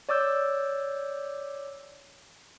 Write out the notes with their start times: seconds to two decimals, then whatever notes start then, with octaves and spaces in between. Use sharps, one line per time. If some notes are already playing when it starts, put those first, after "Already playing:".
0.09 C#5 D5 D6 E6 G6